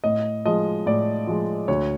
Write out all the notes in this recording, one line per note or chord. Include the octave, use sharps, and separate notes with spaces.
A2 D#5
F3 G#3 D#5
A2 D5
F3 G#3
D2 C#5